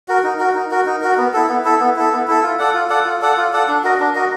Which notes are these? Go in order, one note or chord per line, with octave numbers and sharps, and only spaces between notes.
F#4 A#4
D#4
F#4 A#4
D#4
F#4 A#4
D#4
F#4 A#4
B3
E4 A4
B3
E4 A4
B3
E4 A4
B3
E4 A4
F4
A4 D5 F#5
F4
A4 D5 F#5
F4
A4 D5 F#5
F4
A4 D5 F#5
D4
F#4 A#4 D#5
D4
F#4 A#4 D#5